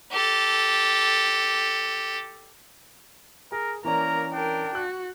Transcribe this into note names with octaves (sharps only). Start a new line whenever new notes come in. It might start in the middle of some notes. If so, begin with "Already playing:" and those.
G4 A4
G#4 A#4
E3 A#3 C#4 A#4 D5 A#5
D4 A#4 G5
F#4 F#6